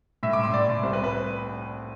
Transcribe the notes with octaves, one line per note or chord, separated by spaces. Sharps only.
A2 E5
A2 D6
C6
A2 D5
A2
C2 C5
B4
B4